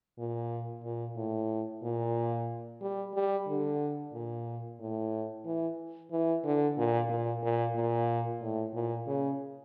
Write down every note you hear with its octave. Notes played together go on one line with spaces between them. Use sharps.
A#2
A#2
A2
A#2
G3
G3
D3
A#2
A2
E3
E3
D3
A#2
A#2
A#2
A#2
A2
A#2
C#3